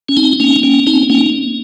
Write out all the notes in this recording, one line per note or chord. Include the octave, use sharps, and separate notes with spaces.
C#4
C4 D#4
A#3 C#4
A#3 C#4
C4 D#4
A#3 C#4